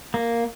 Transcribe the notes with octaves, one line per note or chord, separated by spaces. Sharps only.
A#3